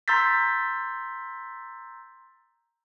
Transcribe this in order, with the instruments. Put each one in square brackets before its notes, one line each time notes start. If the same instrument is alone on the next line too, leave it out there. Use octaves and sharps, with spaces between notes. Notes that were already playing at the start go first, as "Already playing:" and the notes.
[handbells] A#5 C6 E6 G6 A6 B6